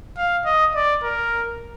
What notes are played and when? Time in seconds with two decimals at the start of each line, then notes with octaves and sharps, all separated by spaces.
0.17 F5
0.45 D#5
0.75 D5
1.03 A#4